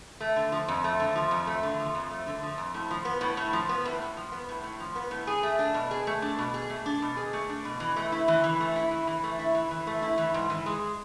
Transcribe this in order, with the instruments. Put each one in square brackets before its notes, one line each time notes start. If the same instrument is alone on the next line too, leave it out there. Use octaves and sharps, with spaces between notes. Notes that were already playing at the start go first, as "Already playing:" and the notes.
[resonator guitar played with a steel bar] A3
D3
F3
F2
A3
D3
F3
F2
A3
D3
F3
F2
A3
D3
F3
F2
A2
F3
B3
A2
A2
F3
B3
A2
A2
F3
B3
A2
A2
F3
B3
A2
G#4
A3
D4
B2
G#4
A3
D4
B2
G#4
A3
D4
B2
G#4
A3
D4
B2
E3
A3
E4
E3
E3
A3
E4
E3
E3
A3
E4
E3
E3
A3
E4
E3
G#2
E3
G#3